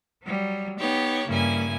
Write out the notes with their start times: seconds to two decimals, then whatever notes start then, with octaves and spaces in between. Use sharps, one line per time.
0.24 F#3 G3
0.78 B3 D#4 G4 C#5
1.28 G2 C#3 A#3 E4 G#5